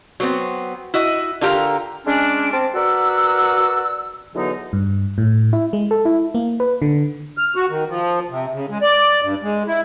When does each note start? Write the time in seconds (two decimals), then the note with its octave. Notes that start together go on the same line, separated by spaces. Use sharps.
0.20 F#3 B3 C4
0.94 E4 F#4 D#5
1.41 D3 D4 F4 G4 A#4 A#5
2.06 G#3 C#4 D4
2.52 C4 A5 D6
2.74 F#4 A#4 B4 D5 F#5 E6
4.34 E2 B2 D3 F#3 B3 D#4
4.73 G2
5.18 A2
5.53 E4
5.73 G#3
5.91 A4
6.05 E4
6.35 A#3
6.60 B4
6.82 D3
7.38 F6
7.56 F#4
7.69 D#3
7.89 F3
8.30 C3
8.53 C#3
8.70 G#3
8.82 D5
9.22 G2
9.43 G#3
9.67 E4